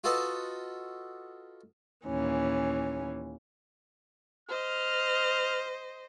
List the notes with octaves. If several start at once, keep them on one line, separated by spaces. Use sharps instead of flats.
F4 F#4 A4 B4 D#5
D#2 A#2 E3 C#4
C5 D#5 F6